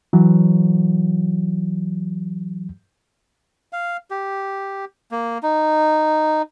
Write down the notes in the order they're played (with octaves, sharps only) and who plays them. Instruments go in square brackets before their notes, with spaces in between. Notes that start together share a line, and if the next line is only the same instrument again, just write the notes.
[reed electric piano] E3 F#3
[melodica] F5
G4
A#3
D#4